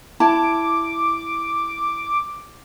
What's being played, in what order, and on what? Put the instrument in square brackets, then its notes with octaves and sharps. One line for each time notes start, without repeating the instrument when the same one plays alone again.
[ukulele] E4 A5 [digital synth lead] D6